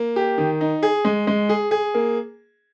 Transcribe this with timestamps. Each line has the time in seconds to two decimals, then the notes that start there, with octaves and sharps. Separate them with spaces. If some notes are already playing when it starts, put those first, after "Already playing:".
Already playing: A#3
0.16 G4
0.38 D#3
0.61 D#4
0.83 G#4
1.05 G#3
1.27 G#3
1.49 G#4
1.71 G#4
1.94 A#3